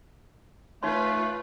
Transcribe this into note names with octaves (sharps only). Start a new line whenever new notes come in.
A3 D#4 F4 B4 C#5 C6